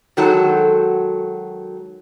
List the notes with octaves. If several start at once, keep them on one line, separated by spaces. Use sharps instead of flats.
D#3 F#3 G#3 F#4 A4